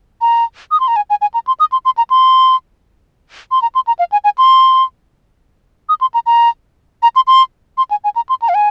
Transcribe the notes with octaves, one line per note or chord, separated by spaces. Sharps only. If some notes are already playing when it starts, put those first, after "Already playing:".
A#5
D#6
C6
A#5
G#5
G#5
G#5
A#5
C6
D#6
C6
C6
A#5
C6
C6
A#5
C6
A#5
F5
G#5
G#5
C6
D#6
C6
A#5
A#5
A#5
C6
C6
C6
G#5
G#5
A#5
C6
A#5
F5
G#5